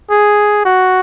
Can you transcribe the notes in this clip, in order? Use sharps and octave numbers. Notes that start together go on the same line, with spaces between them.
G#4
F#4